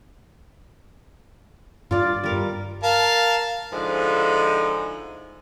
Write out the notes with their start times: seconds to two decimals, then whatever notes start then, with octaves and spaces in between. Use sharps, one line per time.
1.91 G2 F4 D5
2.24 G3 A#4 D6
2.83 A#4 F5 A5
3.72 G#2 D3 F3 D#4 E4